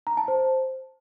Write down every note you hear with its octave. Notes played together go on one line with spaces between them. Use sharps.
A#5
A5
C5